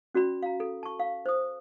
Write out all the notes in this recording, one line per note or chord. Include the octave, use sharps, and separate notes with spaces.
C#4 F#4 D5 B5
F5 A#5
A4
A5 C#6
F5
C5 D#6